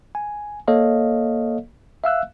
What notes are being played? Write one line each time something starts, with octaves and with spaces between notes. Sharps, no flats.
G#5
A#3 A4 C#5 D#5 F5
E5 F5 E6 F#6